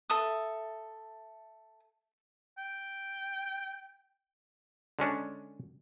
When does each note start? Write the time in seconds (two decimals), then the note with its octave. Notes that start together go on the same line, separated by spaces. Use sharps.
0.10 A4 E5 D#6
2.58 G5
4.99 D3 G#3 C#4 D4